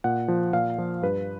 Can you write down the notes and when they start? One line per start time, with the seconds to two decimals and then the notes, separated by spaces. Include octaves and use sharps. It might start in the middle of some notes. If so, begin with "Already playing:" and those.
0.04 A#2 F#5
0.28 F3
0.53 A#2 F5
0.78 F3
1.02 G2 B4